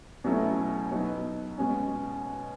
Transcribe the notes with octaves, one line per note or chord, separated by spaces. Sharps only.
B2 F#3 A3 C#4 E4
F#3 B3 D#4
B2 G#3 C#4